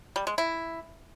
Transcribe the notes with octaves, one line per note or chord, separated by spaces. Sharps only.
G3
G#3
E4